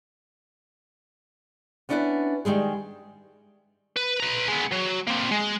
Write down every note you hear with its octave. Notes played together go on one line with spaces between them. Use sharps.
B3 C#4 D4 E4 A#4 B4
D#3 G3 G#3 G#4
B4
B4 A#5
G#3 B3
F#3
A#3 C4
G#3